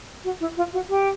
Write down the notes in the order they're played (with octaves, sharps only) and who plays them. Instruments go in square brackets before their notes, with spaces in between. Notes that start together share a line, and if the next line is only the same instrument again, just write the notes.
[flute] F#4
E4
F4
F#4
G4